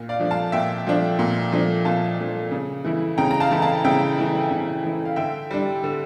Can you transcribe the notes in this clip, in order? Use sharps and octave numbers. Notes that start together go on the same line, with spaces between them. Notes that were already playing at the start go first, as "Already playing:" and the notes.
Already playing: A#2
D5 F5
F3 A3 D4
F5 A5
A#2 E5 G5
F3 A3 D4
A#2
F3 A3 D4
A#2 F5 A5
F3 A3 D4
C#3
E3 A3 E4
C#3 G5 A#5
A#5
F5 A5
E3 A3 E4
F5 A5
C#3 E5 G5
E3 A3 E4
C#3
E3 A3 E4
F5
D3 E5 G5
G3 D4
D3